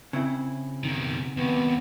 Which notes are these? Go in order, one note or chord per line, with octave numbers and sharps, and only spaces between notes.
C#3 C4 E4
B2 D#3
D#2 C3 B3